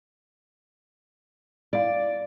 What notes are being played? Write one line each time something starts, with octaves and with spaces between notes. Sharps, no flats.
E4 D5 F5